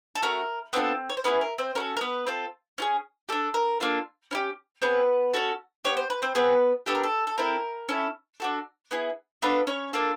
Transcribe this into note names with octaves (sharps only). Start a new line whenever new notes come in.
A4
A3 C#4 F#4 A#4
B3 C4 D4 F4 A4 C5
C#5
C5
B3 C#4 E4 G#4 B4
A#4
C4 C5
C#4 F#4 A4 A#4
A#4
B3 B4
C4 F4 A4
C#4 F4 G#4
D4 G4 A4
A#4
A#3 D4 F4 A4
C#4 E4 G4
B3 C4 G#4 B4
C#4 F#4 A4
B3 D4 G4 C#5
C5
B4
C4 C5
B3 C4 G#4 B4
B3 D4 G4 A4
A#4
A4
A4
C4 E4 A4 A#4
C#4 E4 A4
D4 F#4 A4
B3 E4 G#4
B3 D4 F4 A4 B4
C#4 C#5
A#3 D4 F4 A4